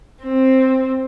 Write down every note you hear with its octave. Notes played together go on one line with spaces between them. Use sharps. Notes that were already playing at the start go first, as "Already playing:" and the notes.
C4